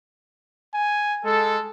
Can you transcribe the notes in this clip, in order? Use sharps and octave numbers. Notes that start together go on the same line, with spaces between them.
G#5
G#3 A4